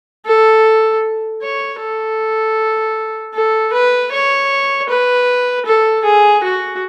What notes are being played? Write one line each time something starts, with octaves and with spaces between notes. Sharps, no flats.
A4
C#5
A4
A4
B4
C#5
B4
A4
G#4
F#4